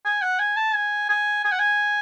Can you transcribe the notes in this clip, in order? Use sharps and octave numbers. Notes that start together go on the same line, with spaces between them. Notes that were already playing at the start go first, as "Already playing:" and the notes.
G#5
F#5
G#5
A5
G#5
G#5
G#5
F#5
G#5